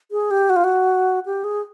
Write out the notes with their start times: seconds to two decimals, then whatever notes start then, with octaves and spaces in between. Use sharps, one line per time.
0.12 G#4
0.31 G4
0.50 F#4
0.56 F4
0.64 F#4
1.26 G4
1.44 G#4